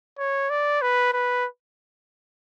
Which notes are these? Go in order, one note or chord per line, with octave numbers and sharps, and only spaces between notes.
C#5
D5
B4
B4